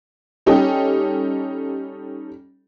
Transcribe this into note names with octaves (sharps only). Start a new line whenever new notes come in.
G3 C#4 D#4 G4 A4